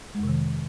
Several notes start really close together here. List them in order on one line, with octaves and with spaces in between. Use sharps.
G#3 F2 C3 D#3